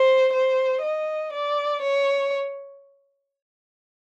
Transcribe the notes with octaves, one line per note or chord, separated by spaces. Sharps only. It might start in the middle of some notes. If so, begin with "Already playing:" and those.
Already playing: C5
C5
D#5
D5
C#5